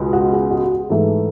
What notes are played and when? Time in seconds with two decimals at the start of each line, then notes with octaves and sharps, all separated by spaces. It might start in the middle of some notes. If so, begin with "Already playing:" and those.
Already playing: C#2 B2 G#3
0.13 F#4
0.32 G#4
0.51 F#4
0.64 F#4
0.71 G#4
0.90 G#2 E3 A3 A4